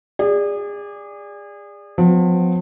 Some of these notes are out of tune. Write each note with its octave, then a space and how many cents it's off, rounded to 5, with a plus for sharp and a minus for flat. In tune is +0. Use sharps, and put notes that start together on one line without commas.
G#4 -30 D5 +0
F3 +40 B3 +45